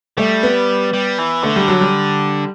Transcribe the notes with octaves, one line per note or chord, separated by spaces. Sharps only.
G3 A3
B3
G3
E3
D3 A3
G3
F#3
G3